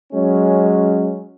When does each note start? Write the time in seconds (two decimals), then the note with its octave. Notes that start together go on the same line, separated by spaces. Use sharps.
0.13 F#3 G#3 C#4